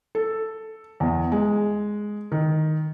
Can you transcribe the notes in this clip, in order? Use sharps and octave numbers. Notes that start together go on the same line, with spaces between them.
A4
E2
G#3
D#3